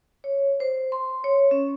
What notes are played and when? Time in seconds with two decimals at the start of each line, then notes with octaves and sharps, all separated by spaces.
0.24 C#5
0.60 C5
0.92 C6
1.24 C#5
1.51 C#4